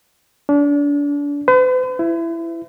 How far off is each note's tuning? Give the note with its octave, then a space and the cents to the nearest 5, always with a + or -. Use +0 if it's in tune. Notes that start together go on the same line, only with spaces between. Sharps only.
D4 -35
B4 +45
E4 +15